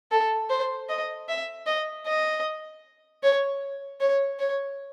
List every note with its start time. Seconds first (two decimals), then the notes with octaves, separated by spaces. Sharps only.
0.11 A4
0.49 C5
0.89 D#5
1.28 E5
1.66 D#5
2.06 D#5
3.23 C#5
4.00 C#5
4.39 C#5